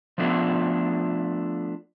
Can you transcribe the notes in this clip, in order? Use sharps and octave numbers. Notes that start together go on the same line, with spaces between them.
F3 A3 B3 D4 F4 A4